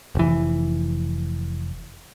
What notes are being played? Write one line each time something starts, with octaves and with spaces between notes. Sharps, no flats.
F1 E3